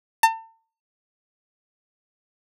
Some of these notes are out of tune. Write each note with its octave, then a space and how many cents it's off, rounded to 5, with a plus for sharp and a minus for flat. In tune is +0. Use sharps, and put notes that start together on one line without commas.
A5 +40